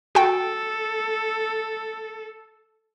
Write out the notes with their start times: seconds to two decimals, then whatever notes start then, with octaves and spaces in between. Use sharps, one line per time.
0.15 F#4 A4 G5